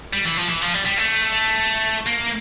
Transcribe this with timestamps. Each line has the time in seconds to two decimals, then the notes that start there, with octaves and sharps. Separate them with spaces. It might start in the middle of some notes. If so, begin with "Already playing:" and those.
0.13 G3
0.25 E3
0.37 F3
0.49 E3
0.61 F3
0.74 G3
0.85 G3
0.98 A3
2.06 A#3